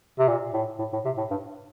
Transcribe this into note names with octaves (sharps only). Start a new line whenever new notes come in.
C3
A#2
A2
A2
A2
C3
A2
G2